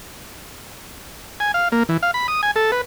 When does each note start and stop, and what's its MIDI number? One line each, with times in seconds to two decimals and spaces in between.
1.40 1.52 80
1.54 1.68 77
1.72 1.83 58
1.89 1.97 52
2.03 2.11 77
2.14 2.27 83
2.28 2.41 87
2.43 2.51 80
2.56 2.71 69
2.72 2.81 71